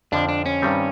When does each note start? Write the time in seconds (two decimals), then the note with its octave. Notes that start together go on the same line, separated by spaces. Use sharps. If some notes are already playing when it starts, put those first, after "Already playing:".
0.12 F2 D3 F3 D4
0.29 D4
0.46 C#4
0.62 G2 D#3 G3 C4